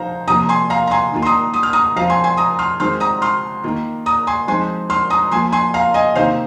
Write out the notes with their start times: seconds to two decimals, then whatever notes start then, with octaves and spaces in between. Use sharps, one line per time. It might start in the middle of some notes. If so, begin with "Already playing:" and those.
Already playing: F3 D#4 C5 F5 A#5
0.28 C3 F3 A#3 F4 A#5 D#6
0.49 G#5 C6
0.70 F5 A#5
0.87 A#5
0.91 G#5 C6
1.12 D#3 A#3 F4
1.22 C6
1.25 A#5 D#6
1.54 D#6
1.63 F6
1.73 A#5 D#6
1.96 F3 C4 F4 F5 A#5
2.10 G#5 C6
2.24 G#5 C6
2.37 A#5 D#6
2.59 C6 F6
2.80 D#3 G#3 C4 F4 C6 F6
3.00 A#5 D#6
3.22 C6 F6
3.64 D#3 A#3 F4
4.06 A#5 D#6
4.27 G#5 C6
4.48 F3 G#3 C4 D#4 G#5 C6
4.90 C6 F6
5.10 A#5 D#6
5.31 F3 A#3 F4 G#5 C6
5.52 G#5 C6
5.74 F5 A#5
5.94 D#5 G#5
6.15 C3 D#3 A#3 D#4 C5 F5